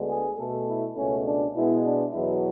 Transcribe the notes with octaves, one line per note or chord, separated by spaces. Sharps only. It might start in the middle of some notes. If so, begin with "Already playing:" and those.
Already playing: D2 D3 G#3 B3
G#4
B2 A3 A4
E4
C#2 B2 A3 C#4
D4
B2 G#3 B3 E4
D4
E2 B2 F#3 B3 E4